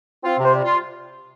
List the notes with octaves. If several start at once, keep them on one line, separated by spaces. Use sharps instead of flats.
C4 F4
C3
C5
G3
F4